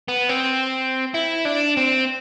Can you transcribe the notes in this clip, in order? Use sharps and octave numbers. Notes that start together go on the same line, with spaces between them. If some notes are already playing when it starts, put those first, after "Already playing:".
B3
C4
E4
D4
C4